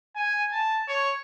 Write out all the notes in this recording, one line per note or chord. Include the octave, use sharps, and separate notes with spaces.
G#5
A5
C#5